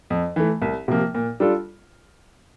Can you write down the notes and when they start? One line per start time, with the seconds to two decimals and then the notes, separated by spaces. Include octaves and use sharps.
0.10 F2
0.36 E3 A3
0.62 C2
0.88 C3 F3 A#3
1.15 A#2
1.40 G3 D4 F4 A4